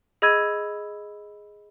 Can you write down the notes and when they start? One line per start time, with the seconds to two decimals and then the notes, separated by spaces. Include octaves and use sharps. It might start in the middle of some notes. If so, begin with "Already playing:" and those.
0.22 G#4 D#5 B5 E6 G#6 D#7